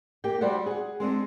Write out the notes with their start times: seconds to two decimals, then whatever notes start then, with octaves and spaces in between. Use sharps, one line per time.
0.24 A#3 G4 G5
0.41 G3 F#4 C5 D5 E5 F#5
0.66 G#4 F#5
1.00 G#3 C4 D4 D#4